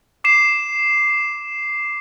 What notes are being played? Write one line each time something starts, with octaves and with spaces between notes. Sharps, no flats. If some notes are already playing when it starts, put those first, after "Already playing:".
D6 C7 E7